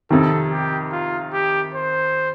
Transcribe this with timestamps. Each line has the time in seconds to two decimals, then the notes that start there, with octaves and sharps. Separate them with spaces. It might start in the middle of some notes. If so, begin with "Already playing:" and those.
0.11 F2 C3 D#3 A4
0.52 G4
0.92 F4
1.33 G4
1.75 C5